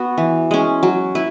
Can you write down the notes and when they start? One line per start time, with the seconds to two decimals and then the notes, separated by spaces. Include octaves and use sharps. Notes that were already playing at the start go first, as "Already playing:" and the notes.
Already playing: B3 F#4
0.18 E3
0.51 G#3 C#4
0.83 F#3
1.15 E4 B4